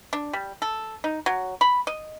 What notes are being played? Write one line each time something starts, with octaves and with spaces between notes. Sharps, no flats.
D4
G3
A4
D#4
F#3
B5
D#5